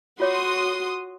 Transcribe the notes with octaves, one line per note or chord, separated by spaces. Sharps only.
F4 F#4 C#5 C6 D6 D#6